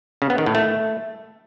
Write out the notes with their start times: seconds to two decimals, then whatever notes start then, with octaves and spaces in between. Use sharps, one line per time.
0.22 C#3
0.30 B3
0.38 D#3
0.46 A2
0.55 A3